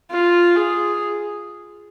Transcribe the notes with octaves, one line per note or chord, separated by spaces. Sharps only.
F4
G#4